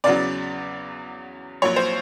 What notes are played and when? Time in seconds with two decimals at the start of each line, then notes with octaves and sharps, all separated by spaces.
0.04 E2 C#3 F#3 D5
1.62 A#1 A#2 F#3 C#5
1.76 C5